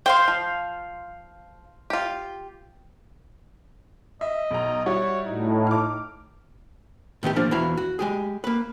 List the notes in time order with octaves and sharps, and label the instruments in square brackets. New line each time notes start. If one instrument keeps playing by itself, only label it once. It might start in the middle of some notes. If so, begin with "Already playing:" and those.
[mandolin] C5 F5 C6 [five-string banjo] G5
[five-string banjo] F3
F4 G4
[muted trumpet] D#5 [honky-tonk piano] E5
[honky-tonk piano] B1 A#5
[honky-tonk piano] G3 E4 F#4 [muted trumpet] C#5
[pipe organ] A2 [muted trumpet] D#4
[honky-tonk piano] D6 F6
[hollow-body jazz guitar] A2 D#3 B3 G4
F3 A#3 D4 F4 A#4
E2 E4 F#4 F5
F#4
G#3 G4 G#4
A#3 B4